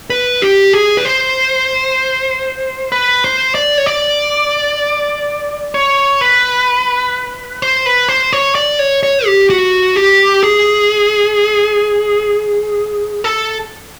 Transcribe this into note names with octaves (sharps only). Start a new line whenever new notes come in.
B4
G4
G#4
B4
C5
B4
C5
D5
C#5
D5
C#5
B4
C5
B4
C5
C#5
D5
C#5
C#5
G4
F#4
G4
G#4
A4